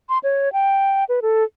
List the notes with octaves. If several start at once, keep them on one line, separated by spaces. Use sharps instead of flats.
C6
C#5
G5
B4
A4